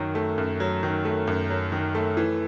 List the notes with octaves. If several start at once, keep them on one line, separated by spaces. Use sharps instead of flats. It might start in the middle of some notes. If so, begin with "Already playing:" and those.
Already playing: F#2 D#3 F#3
A3
F#2
F#3
D#3
A3
F#2
F#3
D#3
A3
E3